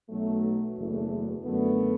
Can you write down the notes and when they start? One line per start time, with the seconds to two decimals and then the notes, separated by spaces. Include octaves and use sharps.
0.09 B1 B2 F#3 A3
0.77 F#1 E2 E3 A3
1.44 F#2 D3 A3 B3